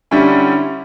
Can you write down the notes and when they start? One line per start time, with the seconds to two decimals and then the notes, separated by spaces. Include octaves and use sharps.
0.11 D3 G3 C#4 E4